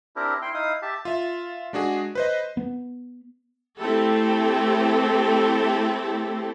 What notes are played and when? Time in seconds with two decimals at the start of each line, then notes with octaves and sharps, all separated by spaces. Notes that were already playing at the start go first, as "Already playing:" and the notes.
0.16 C4 D4 E4 G4 A#4
0.42 E4 G5 C6
0.54 D#4 E4 F5 D#6
0.82 G4 E5 A5
1.05 F4 E5
1.73 G#3 D4 F#4 G#4
2.15 B4 C5 D#5
2.57 B3
3.79 A3 C4 E4 G4 A4